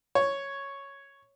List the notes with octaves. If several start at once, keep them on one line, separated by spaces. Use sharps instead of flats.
C#5